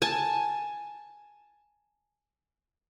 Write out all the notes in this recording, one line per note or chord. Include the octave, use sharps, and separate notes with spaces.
G#5 A5